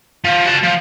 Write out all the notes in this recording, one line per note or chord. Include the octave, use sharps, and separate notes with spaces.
F3
F#4 A5
F3